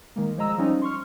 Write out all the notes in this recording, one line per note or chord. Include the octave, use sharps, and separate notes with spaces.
D#3 G#3 A#3
F3 G#3 D#5 A#5 E6
F3 G3 C#4 D#4
C6 C#6 F6